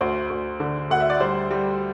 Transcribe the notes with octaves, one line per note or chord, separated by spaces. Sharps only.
D2 C5
D2
D3
D2 F#5
E5
D5
G3 C5
G3